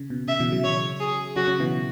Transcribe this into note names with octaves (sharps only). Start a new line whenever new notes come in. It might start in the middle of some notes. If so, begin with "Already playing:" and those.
Already playing: C#3
B2
C#3 E5
B2 E3
C#3 F#3
C#5
G#4
C#3 F#3 F#4
C#3
B2 E3